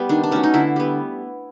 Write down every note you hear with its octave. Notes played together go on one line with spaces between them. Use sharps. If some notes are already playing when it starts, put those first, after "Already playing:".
Already playing: G3 B3
D#3 D4
D4
F#3 A3 C#4
D#4
D3 E4
G3 B3